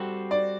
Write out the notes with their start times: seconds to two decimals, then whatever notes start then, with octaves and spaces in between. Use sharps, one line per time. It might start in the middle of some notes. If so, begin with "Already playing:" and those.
Already playing: G3 C4 F#4 A4
0.31 D5